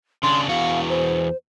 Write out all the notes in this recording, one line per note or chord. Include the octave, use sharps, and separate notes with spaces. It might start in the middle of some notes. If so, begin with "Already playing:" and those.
C#3 D4 C6
E2 F#4 F5
C5